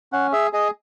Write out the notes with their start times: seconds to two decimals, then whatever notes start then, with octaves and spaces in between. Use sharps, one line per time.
0.13 C#4 F#5
0.32 G#4 E5
0.53 G#4 D#5